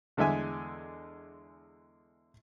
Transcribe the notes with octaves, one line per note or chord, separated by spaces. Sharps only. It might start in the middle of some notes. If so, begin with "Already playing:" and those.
E2 D3 G#3 E5 G#5